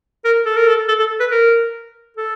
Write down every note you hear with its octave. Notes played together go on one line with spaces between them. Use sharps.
A#4
A4
A#4
A4
A4
A4
B4
A#4
A4